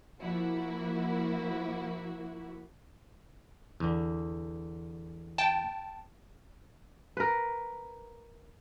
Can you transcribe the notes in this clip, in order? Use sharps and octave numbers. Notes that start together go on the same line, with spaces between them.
F3 A#3 E4 F#4
E2 D3
G5 A5
A#4 B4